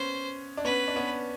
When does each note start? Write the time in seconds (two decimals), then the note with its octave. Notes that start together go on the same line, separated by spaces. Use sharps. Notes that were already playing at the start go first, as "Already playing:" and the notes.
Already playing: B3 C#4 C5
0.57 D4
0.64 B3 C#4 B4
0.88 D4
0.96 B3 C#4